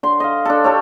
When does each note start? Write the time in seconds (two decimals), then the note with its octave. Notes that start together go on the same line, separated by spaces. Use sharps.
0.03 D3 C6
0.20 D#5 F5
0.45 D4 A4
0.64 G4 A4 C#5